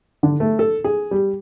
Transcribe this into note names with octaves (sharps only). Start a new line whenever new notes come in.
D3
A3
A4
G#4
G3